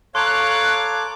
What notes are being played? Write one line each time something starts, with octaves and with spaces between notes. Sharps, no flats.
A4 C#5 F5 A#5 C6 D6 F#6